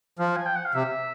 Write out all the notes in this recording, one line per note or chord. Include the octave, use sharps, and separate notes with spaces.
F3 F5
G#5
G5
F#5
F5
C3 E5